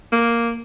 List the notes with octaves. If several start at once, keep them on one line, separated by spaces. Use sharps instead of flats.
A#3